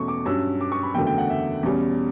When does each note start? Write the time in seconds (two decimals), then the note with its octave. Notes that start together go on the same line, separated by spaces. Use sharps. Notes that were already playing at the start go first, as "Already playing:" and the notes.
Already playing: E2 B2 A3 C#4 C#6
0.08 D6
0.26 G2 F#3 C#4 E6
0.61 D6
0.72 C#6
0.83 B5
0.94 F#1 E2 D3 F#3 A3 G5
1.07 G5
1.18 F#5
1.30 E5
1.63 E2 B2 G3 C#4